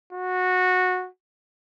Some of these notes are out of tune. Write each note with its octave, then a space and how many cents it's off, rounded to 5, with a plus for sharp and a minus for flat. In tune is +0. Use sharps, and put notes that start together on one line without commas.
F#4 -15